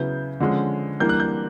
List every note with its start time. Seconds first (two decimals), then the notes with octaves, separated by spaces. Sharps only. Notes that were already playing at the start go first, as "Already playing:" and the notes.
Already playing: C#3 F#3 B3 E4 G6
0.40 D3 F3 G#3 C#4
1.00 E3 G3 A#3 D4 G6
1.09 F#6
1.20 G6